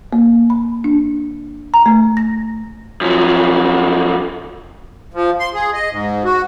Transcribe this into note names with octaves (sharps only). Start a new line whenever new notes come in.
A#3
B5
D4
A#5
A3
A#6
F#2 F3
F3
C6
G#4
D#5
G#2
F#4